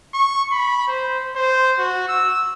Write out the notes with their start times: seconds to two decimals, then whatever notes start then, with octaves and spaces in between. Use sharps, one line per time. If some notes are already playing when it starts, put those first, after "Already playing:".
0.14 C#6
0.52 B5
0.88 C5
1.36 C5
1.79 F#4
2.08 E6